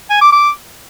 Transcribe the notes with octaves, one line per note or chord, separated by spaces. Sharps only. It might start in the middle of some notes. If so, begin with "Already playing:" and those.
G#5
D6
D6